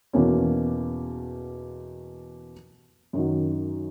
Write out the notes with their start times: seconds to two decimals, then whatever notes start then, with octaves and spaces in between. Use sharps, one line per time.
0.13 E2 B2 A#3 C#4
3.13 F#2 D#3 F#3